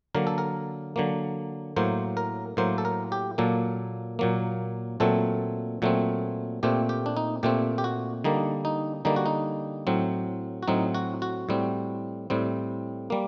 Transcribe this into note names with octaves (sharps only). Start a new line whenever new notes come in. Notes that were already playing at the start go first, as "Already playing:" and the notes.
D3 F#3 A#3 A#4
A4
A#4
D3 F#3 A#3
A2 F#3 A#3 C5
A#4
A2 F#3 A#3 C5
A4
A#4
G4
A#2 F#3 A#3 A4
A#2 F#3 A#3
A#2 F#3 A3 C4 A4
A#2 F#3 A3 C4
A#2 A3 C4 G4
G4
D4
D#4
A#2 A3 C4 G4
G4
F#4
D3 G3 A#3 D#4
D#4
D3 G3 A#3 D#4
F#4
D#4
A2 F#3 C4
F#4
A2 F#3 C4 D#4
F#4
F#4
A2 G3 C4
A2 G3 C4
G3 A#3